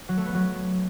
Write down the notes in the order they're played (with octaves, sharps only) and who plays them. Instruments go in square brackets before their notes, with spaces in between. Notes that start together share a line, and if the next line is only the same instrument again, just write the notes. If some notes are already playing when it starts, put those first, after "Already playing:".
[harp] F#3
A3
B3
F#3